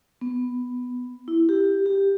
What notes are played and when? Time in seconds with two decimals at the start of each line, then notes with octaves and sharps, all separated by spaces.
0.21 B3
1.28 E4
1.49 G4
1.86 G4